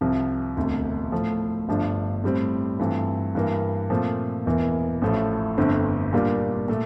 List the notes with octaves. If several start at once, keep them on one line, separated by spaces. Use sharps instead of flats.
C2 C3 F3
E1 D2 C3
A2 F3 A3
G1 G2 F3 A3 D4
A2 G3 C4
G2 E3 A3 C4 F4
G2 E3 A#3
A#2 F3 A3 C4
E1 E2 E3 A#3
A1 A2 F3 A3
G1 F2 D3 A3 C4
A#2 G3 A#3 D4 F4
A#2 A3